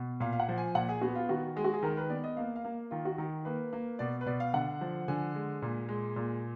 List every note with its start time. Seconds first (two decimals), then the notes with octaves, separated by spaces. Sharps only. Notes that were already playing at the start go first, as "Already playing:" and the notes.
Already playing: B2
0.20 A#2 F5
0.33 F5
0.40 F#5
0.49 F3
0.58 G#5
0.75 A#2 F#5
0.89 G#4
1.01 B3 F#4
1.15 F4
1.29 D#3 F#4
1.56 G#3 G#4
1.64 F#4
1.74 G#4
1.83 D#3 A#4
1.97 B4
2.10 B3 D5
2.24 D#5
2.37 A#3 F5
2.56 F5
2.65 A#3
2.91 D#3 F4
3.05 F#4
3.18 D#3
3.45 A#3 B4
3.73 A#3
3.99 B2 D5
4.21 B4
4.26 B2 D5
4.40 F5
4.54 D3 F#5
4.81 F3
5.08 D3 G#5
5.35 G#3
5.62 A#2
5.89 G#3
6.16 A#2